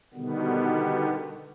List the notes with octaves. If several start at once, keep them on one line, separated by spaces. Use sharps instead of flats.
B2 D3 D#3 G3 B3